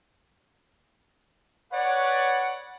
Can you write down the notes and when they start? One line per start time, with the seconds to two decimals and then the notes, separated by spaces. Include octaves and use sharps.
1.72 B4 C#5 D5 F#5